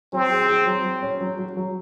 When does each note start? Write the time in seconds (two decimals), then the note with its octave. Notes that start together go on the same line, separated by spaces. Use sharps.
0.13 F#3 C4
0.31 G#4
0.48 G#4
0.66 F#3
0.84 F#3
1.03 C#4
1.21 F#3
1.39 F#3
1.57 F#3